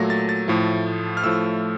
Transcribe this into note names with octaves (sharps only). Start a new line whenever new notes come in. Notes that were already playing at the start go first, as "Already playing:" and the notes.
Already playing: A#2 F#3 A3 A#6
A6
A6
A2 F3 A3
F6
A2 F3 A3 E6